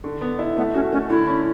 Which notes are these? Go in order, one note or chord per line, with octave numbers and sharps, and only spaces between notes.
D3
B3
E4
A3 B3
C#4 F#4
A3 C#4
D3 E4
C#4